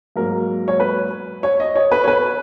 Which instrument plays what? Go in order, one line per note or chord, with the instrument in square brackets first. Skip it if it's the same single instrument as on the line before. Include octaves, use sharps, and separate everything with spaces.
[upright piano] G#2 F#3 A#3 A#4
C#5
B4
C#5
D#5
C#5
B4
C#5
B4